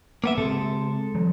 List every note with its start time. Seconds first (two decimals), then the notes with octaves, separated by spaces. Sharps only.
0.24 A#3 B3 E5
0.38 C#3 G#3 C4 A4
1.15 F3 G3